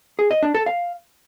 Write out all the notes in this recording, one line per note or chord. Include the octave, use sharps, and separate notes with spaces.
G#4
D#5
D4
A4
F5